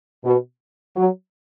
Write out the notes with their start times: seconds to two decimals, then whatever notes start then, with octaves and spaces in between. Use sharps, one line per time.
0.24 B2
0.96 F#3